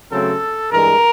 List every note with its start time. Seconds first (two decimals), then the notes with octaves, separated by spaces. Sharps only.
0.12 C#3 F#3 A3 C4 A4
0.72 G2 E3 G#3 A#4